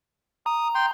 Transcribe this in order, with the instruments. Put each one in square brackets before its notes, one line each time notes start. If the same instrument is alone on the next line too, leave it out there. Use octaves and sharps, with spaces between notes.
[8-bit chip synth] A#5 [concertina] D#6
[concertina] G5 C6